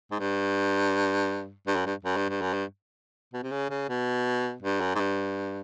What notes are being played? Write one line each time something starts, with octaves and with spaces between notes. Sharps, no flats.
G#2
G2
G2
F#2
G2
F#2
G2
G2
F#2
G2
B2
C3
C#3
C#3
B2
G2
F#2
G#2
G2